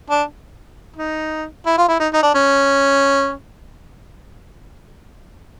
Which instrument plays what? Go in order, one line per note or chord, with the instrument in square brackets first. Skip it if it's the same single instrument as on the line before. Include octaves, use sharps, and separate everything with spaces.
[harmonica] D4
D#4
E4
F4
E4
D#4
D#4
D4
C#4